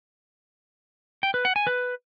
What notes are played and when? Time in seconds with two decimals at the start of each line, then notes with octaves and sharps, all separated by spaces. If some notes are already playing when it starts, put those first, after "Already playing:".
1.23 G5
1.34 B4
1.45 F#5
1.56 G#5
1.67 B4